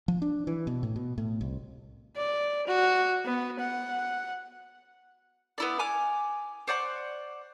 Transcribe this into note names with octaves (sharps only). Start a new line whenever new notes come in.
F3
D4
E3
B2
A2
B2
A2
C2
D5
F#4
B3
F#5
B3 E4 D5
G#5 D6 F6
C5 D5 F#5 C#6